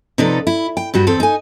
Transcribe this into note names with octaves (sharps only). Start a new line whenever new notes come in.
C3 F3 D#4 A4 B4 D5
E4
G5
G2 G3 F#4
E2 C4 A4
D#4 G#5